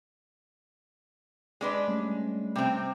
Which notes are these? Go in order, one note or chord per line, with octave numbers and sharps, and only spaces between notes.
G#3 D4 B4
G3 A3 C#4
C3 C4